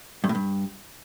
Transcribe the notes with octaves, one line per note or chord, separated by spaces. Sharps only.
G2
A2
G2